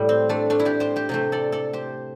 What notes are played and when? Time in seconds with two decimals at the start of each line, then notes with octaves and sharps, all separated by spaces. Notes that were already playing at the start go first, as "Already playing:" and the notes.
Already playing: A2 G3
0.09 C4
0.29 A3 D4
0.50 A3 D4
0.60 E4
0.65 D4 G4
0.80 G4 C5
0.96 G4 C5
1.09 C3 A3 G4 C5
1.32 A4 D5
1.52 A4 D5
1.73 G4 C5